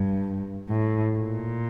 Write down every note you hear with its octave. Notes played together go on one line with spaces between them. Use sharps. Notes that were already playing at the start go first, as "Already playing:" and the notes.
Already playing: G2
A2
A#2